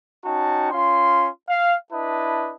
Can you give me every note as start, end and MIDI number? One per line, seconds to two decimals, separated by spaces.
0.24 0.68 61
0.24 0.68 63
0.24 0.68 66
0.24 0.68 79
0.24 0.68 81
0.71 1.28 61
0.71 1.28 65
0.71 1.28 84
1.49 1.76 77
1.92 2.54 62
1.92 2.54 64
1.92 2.54 71
1.92 2.54 75
1.92 2.54 81